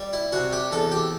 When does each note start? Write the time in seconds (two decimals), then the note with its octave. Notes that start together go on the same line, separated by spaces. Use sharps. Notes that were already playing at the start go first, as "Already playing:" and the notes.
Already playing: G3
0.13 E4
0.32 C3 F#4
0.53 G4
0.71 E2 A4
0.91 G4